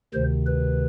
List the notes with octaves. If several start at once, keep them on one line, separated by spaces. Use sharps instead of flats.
D2 C3 D#3 C5
B4